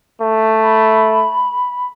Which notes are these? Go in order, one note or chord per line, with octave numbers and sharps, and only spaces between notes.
A3
B5